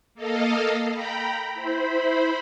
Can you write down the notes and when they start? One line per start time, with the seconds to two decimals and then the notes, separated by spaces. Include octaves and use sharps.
0.14 A#3 A4 D#5 F5
0.92 G5 A#5 B5
1.54 E4 C5 B5